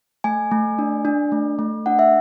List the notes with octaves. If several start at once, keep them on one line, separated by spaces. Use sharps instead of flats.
A3 G#5
A3
D4
D4
A3
A3
D4 F#5
E5